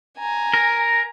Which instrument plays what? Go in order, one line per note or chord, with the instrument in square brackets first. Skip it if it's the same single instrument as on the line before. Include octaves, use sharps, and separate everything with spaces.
[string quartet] G#5 A#5
[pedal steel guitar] A#4